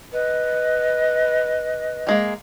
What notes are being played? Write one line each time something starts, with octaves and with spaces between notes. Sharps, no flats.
B4 D#5
G3 G#3 A#3